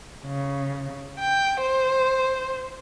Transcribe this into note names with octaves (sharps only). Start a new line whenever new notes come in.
C#3
G5
C5